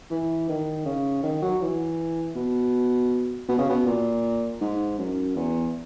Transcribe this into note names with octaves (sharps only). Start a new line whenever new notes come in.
E3
D#3
C#3
D#3
F#3
E3
B2
B2
C#3
B2
A#2
G#2
F#2
E2